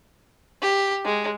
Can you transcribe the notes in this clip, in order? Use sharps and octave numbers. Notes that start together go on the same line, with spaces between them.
G4
G#3